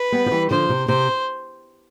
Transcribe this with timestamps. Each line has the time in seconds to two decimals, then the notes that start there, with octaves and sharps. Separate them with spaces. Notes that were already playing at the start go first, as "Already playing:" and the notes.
Already playing: B4
0.12 G3 B3
0.26 F3
0.31 E3 G3
0.50 D3 F3 C5
0.70 C3
0.88 C3 C5